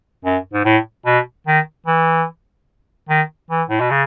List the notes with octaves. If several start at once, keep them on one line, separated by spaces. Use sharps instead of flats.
F#2
G#2
A2
B2
D#3
E3
D#3
E3
A2
B2
C#3